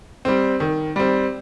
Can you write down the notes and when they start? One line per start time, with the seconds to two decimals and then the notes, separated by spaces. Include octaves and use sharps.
0.25 G3 C4
0.60 D#3
0.96 G3 C4